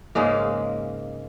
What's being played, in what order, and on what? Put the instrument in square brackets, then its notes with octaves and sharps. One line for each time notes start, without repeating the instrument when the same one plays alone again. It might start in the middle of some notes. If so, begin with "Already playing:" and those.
[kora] G#2 C#3 G#3 A#3